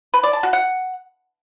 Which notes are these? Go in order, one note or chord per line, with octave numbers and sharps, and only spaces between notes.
B4
D5
A5
F#4
F#5